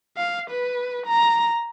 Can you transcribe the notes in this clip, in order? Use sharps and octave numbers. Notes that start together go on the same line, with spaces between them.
F5
B4
A#5